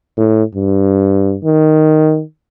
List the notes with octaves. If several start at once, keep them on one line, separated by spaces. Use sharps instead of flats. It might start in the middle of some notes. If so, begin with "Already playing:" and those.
A2
G2
D#3